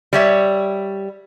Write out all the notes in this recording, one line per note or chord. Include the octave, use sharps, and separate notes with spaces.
G3 C#5 E5